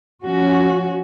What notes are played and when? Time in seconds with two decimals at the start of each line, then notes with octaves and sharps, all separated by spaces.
0.23 F3 C#4 F#4